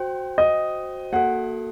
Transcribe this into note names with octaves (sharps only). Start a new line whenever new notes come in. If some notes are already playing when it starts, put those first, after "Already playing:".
Already playing: F#4 C5 G5
D#5
A#3 F#4 A4 F#5